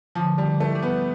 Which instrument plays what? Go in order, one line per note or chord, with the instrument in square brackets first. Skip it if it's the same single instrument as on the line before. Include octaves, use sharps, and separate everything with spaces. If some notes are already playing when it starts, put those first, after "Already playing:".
[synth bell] D3 [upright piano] F3
[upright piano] G3
[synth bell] D3
[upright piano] A3
[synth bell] G3
[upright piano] B3